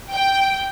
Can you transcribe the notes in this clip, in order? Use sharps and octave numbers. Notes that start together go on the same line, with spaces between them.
G5